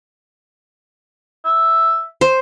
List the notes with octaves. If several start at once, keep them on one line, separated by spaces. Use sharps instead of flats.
E5
C5